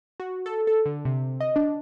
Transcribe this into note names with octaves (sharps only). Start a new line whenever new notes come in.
F#4
A4
A4
D3
C3
D#5
D4